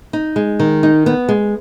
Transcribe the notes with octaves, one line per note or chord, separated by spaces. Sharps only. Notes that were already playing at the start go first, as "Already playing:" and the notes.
D#4
G#3
D#3
D#4
B3
G#3